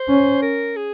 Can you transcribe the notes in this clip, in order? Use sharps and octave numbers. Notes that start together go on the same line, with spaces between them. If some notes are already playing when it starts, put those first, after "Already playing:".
Already playing: C5
C#4
A#4
G#4